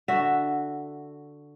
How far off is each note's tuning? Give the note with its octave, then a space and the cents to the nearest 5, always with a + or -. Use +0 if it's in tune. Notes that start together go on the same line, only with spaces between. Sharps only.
D3 +0 F#4 +0 E5 +5